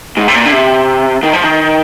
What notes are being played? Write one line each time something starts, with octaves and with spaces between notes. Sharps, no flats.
G#2
C3
A#2
D3
C3
D#3
F3
D#3